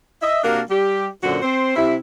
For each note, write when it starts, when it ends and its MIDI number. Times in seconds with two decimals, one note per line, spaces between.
0.22 0.42 75
0.22 0.42 76
0.43 0.60 48
0.43 0.60 58
0.43 0.60 62
0.43 0.60 66
0.43 0.60 70
0.69 1.07 55
0.69 1.07 67
1.23 1.41 42
1.23 1.41 46
1.23 1.41 50
1.23 1.41 66
1.23 1.41 72
1.42 1.74 60
1.42 1.74 72
1.76 1.96 48
1.76 1.96 64